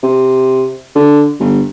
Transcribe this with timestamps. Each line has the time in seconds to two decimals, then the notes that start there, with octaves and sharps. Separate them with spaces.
0.03 C3
0.95 D3
1.40 G1